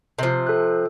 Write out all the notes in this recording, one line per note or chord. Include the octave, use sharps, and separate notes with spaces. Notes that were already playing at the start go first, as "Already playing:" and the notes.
C3 F3
A4 F#6